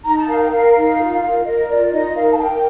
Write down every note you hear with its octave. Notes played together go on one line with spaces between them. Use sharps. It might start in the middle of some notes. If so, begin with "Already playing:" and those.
D#4 A#5
A5
A#4 F5
G5
A#4 F5
D#4
F4
A#4
A#4 D#5
F4 D5
D#4 D#5
A#4 F5
A5
A#4 G5